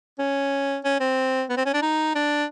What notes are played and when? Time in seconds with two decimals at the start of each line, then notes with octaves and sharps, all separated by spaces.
0.19 C#4
0.84 C#4
1.00 C4
1.50 B3
1.57 C4
1.66 C#4
1.74 D4
1.82 D#4
2.15 D4